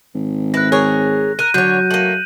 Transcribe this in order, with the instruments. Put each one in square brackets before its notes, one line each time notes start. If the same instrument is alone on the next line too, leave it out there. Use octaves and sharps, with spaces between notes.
[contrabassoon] G#1
[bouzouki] E4 B4 [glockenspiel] F#6 A#6
[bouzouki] G#4 A#4 C#5
[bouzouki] A#4 [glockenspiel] F#6 D#7
[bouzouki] D3 C#5 [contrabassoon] F#3 [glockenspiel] G6
[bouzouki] A3 A#3 [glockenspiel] D#7 F#7